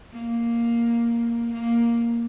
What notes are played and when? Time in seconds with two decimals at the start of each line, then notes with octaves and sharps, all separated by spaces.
0.12 A#3
1.53 A#3